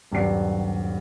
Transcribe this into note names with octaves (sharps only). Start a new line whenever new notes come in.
D#1 G2 F#3 D5 C7